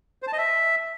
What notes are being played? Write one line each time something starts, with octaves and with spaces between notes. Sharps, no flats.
C5
A5
D#5
E5